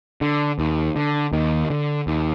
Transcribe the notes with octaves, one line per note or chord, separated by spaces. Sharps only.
D3
D#2
D3
D#2 D#3
D3
D#2